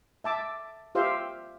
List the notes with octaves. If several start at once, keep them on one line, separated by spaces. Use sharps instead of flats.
E5 A5 D6
F4 G4 C5 E5 F5